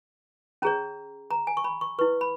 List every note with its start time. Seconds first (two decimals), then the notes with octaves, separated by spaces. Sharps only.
0.62 C#4 G#4 C#5 A#5
1.31 A#5
1.47 G#5
1.57 C#6
1.64 B5
1.81 C#6
1.99 E4 B4 C#6
2.21 B5